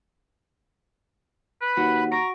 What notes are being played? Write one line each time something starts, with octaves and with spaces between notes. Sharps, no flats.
B4 B5
D#2 F#4
A#5 C#6 A#6 D7